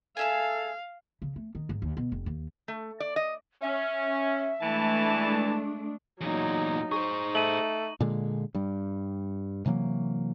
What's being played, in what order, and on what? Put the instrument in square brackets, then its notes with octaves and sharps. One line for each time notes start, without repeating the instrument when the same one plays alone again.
[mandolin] G#4 E5 G#5 [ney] A4 [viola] F5
[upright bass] C#3
A3
D#3
G#2
D#2
B2
F1
D#2
[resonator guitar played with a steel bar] A3
D5
D#5
[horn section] C#4 [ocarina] E5
[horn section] E3 A5 [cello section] G#3 A3 D4
[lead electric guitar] E2 A#2 [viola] F#3 D#4
[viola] D#4 [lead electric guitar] G#4 C5 [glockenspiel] C#6
[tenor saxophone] A3 [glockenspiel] D#7 F#7
[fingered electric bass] A#2 D3 G#3
G2 G3
C3 E3 F#3 A#3